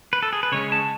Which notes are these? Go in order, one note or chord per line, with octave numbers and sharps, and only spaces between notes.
B4
A4
G#4
B4
C#3 G#3 C#4 C#5
A5